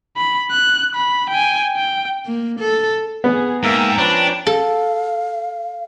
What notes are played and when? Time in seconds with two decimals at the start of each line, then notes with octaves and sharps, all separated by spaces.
0.17 B5
0.51 F#6
0.95 B5
1.30 G5 G#5
1.77 G5
2.26 A#3
2.60 A4
3.24 B3 G#4
3.63 G#2 A#3 E5 F5 G5 A#5
3.98 F3 C#4 D4 B4
4.47 A4 F5